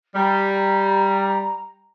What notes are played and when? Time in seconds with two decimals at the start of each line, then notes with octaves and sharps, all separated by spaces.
0.15 G3 A#5